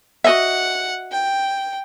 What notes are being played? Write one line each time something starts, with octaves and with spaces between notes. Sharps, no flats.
F#4 D#5 E5 F#5
G5